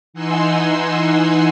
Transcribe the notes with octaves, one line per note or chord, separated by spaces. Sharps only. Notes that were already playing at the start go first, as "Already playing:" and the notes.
E3 D#4 F#5 G#5 C6 E6